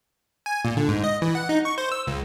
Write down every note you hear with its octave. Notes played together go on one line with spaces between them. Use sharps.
G#5
A#2
D3
G#2
D#5
E3
F#5
D#4
C#6
C5
E6
C#2